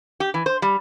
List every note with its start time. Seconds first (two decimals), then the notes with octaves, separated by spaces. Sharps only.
0.20 G4
0.34 E3
0.46 C5
0.62 G3